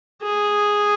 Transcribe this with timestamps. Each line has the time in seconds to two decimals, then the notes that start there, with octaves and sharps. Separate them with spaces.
0.23 G#4